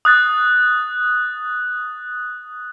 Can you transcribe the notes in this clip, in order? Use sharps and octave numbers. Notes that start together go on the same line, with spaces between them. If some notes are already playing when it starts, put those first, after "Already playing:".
D#6 F#6 A6